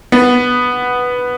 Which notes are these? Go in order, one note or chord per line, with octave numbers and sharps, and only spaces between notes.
B3